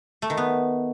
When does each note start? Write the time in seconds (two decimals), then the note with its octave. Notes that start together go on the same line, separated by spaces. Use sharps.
0.22 A3
0.30 D#3
0.37 B3